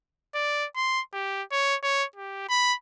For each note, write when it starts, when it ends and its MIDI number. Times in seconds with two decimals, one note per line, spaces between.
0.35 0.66 74
0.76 1.01 84
1.13 1.43 67
1.51 1.76 73
1.83 2.05 73
2.16 2.49 67
2.49 2.74 83